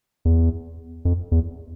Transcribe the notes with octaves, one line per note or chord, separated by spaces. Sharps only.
E2
F2
E2